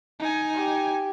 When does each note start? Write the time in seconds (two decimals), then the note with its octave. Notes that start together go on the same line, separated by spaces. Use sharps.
0.19 D#4 G#5
0.54 G4